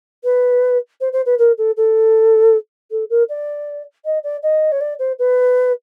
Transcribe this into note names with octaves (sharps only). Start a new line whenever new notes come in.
B4
C5
C5
B4
A#4
A4
A4
A4
A#4
D5
D#5
D5
D#5
C#5
D5
C5
B4